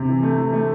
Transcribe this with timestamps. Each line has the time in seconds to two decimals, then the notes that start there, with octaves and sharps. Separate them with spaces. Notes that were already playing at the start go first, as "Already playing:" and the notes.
Already playing: C3
0.08 E3
0.23 A3
0.38 E3
0.53 A3